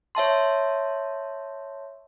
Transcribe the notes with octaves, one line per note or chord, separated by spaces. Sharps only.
C#5 E5 A5 C6